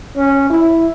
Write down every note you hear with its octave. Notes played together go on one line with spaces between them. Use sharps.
C#4
E4